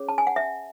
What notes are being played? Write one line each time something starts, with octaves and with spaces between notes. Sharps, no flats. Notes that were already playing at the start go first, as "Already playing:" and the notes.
Already playing: C#4 G#4 C#5
A5
G#5
F#5
E5